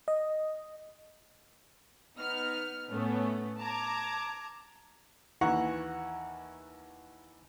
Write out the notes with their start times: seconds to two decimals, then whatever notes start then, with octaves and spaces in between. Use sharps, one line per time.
0.08 D#5
2.18 B3 D#4 F6
2.90 A2 A3 B3 C#4
3.60 A5 A#5 D6 G#6
5.41 D#2 E3 F#5 A#5 C#6